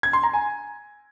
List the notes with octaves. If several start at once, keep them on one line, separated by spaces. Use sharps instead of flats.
G#6
C6
A#5
G#5